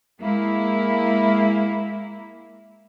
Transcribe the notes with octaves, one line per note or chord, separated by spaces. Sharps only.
G#3 A#3 E4